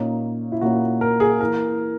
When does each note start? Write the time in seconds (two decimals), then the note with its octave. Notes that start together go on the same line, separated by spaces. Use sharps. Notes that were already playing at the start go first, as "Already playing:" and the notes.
Already playing: A#2 A#3 C#4 D#4
0.52 E4
0.61 A#2 A#3 C#4 F#4
1.01 A#4
1.20 G#4
1.40 E3 A#3 E4 A#4